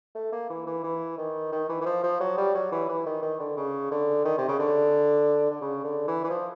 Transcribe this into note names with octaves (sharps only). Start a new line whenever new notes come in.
A3
A#3
E3
E3
E3
D#3
D#3
E3
E3
F3
F3
F#3
G3
F#3
E3
E3
D#3
D#3
D3
C#3
D3
D#3
C3
C#3
D3
D3
C#3
D3
E3
E3
F3